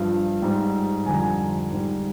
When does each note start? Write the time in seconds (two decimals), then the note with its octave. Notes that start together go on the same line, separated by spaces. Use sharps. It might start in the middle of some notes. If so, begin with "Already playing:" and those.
Already playing: G2 F3
0.42 G#2 G3
1.06 F2 D3 G3 G#5
1.14 A#5
1.23 G#5
1.72 G#2 G3